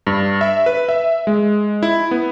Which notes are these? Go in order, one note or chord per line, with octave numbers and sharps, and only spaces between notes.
G2
E5
B4
E5
G#3
E4
B3